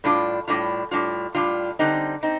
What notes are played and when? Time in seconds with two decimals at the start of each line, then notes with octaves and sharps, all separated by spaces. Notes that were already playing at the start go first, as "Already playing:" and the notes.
0.04 A2 G3 D4 F4
0.48 A2 G3 D4 F4
0.91 A2 G3 D4 F4
1.35 A2 G3 D4 F4
1.79 D3 G3 C4 D#4
2.23 C4 D#4